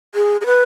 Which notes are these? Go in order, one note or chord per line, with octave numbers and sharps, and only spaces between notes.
G#4
G#4
B4